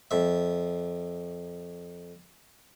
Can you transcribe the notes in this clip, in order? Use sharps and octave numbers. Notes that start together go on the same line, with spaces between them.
F2 E5